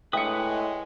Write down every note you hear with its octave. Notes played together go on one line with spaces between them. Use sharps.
A2 G#3 B4 E5 G5 D#6 C#7